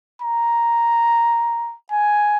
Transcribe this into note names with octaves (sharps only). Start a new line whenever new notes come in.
A#5
G#5